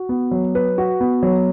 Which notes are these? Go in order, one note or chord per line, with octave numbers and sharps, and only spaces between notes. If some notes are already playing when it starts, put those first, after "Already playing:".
Already playing: F#4
B3
F#3
B4
F#4
B3
F#3